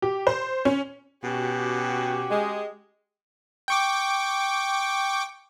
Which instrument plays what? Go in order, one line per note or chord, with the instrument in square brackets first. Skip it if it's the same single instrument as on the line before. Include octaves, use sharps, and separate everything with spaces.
[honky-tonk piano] G4
C5
C#4
[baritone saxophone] B2 [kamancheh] C#4 F#4 [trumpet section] G4
[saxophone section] G#3
[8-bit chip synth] G5 C#6 D6